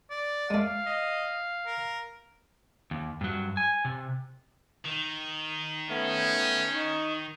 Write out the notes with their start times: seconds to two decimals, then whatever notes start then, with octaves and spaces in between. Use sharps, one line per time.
0.11 D5
0.50 G#3 A3 F5
0.86 D#5
1.67 A#4
2.91 D#2
3.21 G2 F#3
3.57 G#5
3.85 C3
4.85 D#3
5.89 A3 B3 C#4
6.74 D#4 C#6